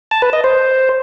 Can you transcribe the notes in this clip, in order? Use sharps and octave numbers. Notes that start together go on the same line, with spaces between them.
A5
B4
D#5
C5